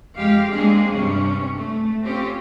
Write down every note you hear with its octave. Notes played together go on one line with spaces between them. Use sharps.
F2 G#3 G4 F5
G#3 A#3 C4 D4 G#4
G2 C3 C#4 D4
A3
C4 C#4 F4 G4